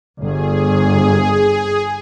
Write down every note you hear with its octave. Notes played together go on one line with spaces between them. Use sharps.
G1 G#4